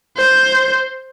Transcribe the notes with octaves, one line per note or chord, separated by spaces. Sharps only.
C5